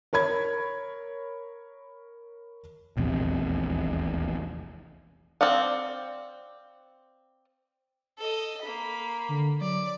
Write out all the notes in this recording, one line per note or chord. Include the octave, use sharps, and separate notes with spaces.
A#4 C#5 B5 G#6
D#1 A#1 E2 C3
C4 D5 F5 F#5
A4 D#5
A#3 B5
D3
F#3 D5